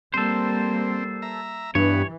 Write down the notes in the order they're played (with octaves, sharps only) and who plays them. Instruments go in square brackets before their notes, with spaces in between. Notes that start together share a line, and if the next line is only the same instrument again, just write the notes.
[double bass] G3 A#3 [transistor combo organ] C4 [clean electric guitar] A4 C5
[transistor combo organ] E5 A#5
[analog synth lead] G2 [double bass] E3 [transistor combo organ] B3 [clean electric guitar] C#5